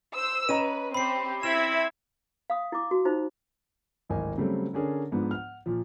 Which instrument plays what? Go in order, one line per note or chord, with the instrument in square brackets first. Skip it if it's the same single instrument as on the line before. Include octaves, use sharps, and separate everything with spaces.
[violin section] C5 E6
[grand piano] C#4 D#5 A#5 [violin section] B4 [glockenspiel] D#7
[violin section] C4 G4 [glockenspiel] B5 C7
[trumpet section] C4 E4 [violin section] E5 G#6 B6 [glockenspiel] E7
[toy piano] F5 D#6
E4 D6
F#4
D#4 F4 C5
[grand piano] D1 G#1 D#4 A#4 G#5
C#3 F#3 G3 A3 C4
D3 C#4 D4 G#4 A#4
G#2 F3 B3 D4
F#5 F6
A#2 F3